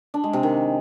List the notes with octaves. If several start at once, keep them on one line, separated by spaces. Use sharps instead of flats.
D4
G#3
C3
D#3